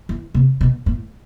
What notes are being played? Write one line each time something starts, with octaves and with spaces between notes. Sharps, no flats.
E3
C3
B2
A2